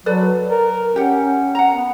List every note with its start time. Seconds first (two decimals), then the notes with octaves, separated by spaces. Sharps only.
0.06 F#3 A4 B4 D5
0.50 A#4
0.96 C#4 G4 F#5
1.55 F#5 A#5
1.74 B3